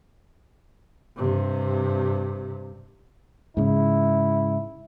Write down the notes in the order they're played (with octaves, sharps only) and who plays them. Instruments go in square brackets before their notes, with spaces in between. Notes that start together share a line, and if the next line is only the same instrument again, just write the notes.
[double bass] G2 C3
[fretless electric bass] G#2 C#3 [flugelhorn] E4